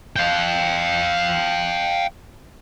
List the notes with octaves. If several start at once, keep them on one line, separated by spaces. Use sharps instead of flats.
F5 G5